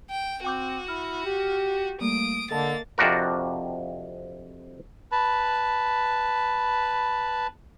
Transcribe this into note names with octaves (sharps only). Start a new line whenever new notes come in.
G5
C4 F#4 G5 D6 G6
E4 F6
G4
G3 A3 A#3 D#6 D7
D3 A#3 A4 D#5 A5 A6
F2 C3 F3 D4 F#4 A#4
B4 A5 B5